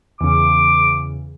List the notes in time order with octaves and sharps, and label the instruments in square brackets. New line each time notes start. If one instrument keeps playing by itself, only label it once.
[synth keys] E2 C#3 [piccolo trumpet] D6